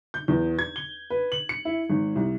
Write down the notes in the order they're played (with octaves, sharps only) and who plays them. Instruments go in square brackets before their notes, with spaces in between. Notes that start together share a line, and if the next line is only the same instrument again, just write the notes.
[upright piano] G6
E2
G#6
G7
B4
F#7
C#7
E4
G#1
C2